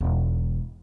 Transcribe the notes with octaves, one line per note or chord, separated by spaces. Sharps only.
E1 G#2